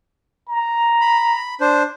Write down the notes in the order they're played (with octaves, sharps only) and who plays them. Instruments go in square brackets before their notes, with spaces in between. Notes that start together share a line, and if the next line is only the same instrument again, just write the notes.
[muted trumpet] A#5
[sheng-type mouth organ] B5
D4 C5